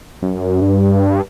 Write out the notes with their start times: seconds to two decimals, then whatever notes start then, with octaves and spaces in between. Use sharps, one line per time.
0.23 F#2
0.61 G2